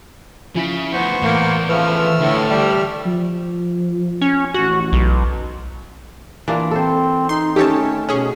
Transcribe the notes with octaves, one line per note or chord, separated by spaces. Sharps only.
C#3 F3 E4 B6
D2 B3 C5 C#6
E2 A2 A#3
C#3 F3 A3 B4 E6 F6
D2 A2 D3
G3
F3
C#4
A1 F#4
B1
E3 A#3 D4 F4
C4 A4 C5
D#4 C6
D#3 A3 C#4 G4 A4 C#5 A5
B2 C#4 G#4